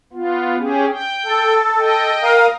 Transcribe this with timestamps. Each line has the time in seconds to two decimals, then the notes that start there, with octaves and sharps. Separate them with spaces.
0.13 B3 F4
0.57 C#4 G4 G#4
0.91 G5
1.26 A4
1.78 D#5 G5
2.23 A#4 F5 D#6